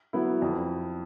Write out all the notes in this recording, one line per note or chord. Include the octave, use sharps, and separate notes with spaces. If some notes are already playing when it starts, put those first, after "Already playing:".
F#3 B3 E4
F2